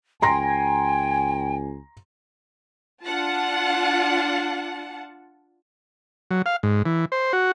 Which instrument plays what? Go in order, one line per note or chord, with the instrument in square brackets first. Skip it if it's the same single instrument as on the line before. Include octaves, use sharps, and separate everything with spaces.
[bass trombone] C#2 [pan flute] G5 [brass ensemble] G#5 [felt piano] A#5 C6 A#6
[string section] D4 F4 F#5 A5
[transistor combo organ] F#3
F5
G#2
E3
C5
F#4